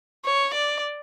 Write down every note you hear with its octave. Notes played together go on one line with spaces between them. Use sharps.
C#5
D5